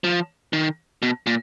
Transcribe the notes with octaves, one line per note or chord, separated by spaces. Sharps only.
F3
D#3
B2
A#2